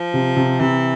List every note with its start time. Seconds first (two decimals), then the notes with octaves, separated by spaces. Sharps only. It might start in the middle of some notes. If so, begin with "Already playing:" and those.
Already playing: F3
0.14 C3
0.36 C3
0.60 C3 E3